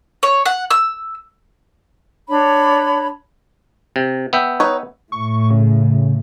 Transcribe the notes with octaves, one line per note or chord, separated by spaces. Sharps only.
C#5
F#5
E6
D4 C#5 B5
C3
B3 E5 G5
D#4 B4 C#5
A2 C#6
C#3